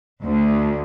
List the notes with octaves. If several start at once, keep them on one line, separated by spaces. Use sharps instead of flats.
D2